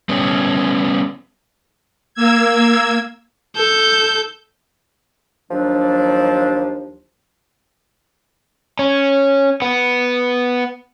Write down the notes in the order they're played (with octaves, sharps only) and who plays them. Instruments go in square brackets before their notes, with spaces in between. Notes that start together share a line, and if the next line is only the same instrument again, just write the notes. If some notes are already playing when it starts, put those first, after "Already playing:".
[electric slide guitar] G3 B3 C#4
[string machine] A#3 E6 G#6
[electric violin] A4 G6
[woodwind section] D#2 F3 F#3 D4
[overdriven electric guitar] C#4
B3